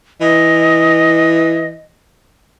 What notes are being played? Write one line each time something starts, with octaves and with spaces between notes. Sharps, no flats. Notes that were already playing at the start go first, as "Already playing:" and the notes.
E3 D#5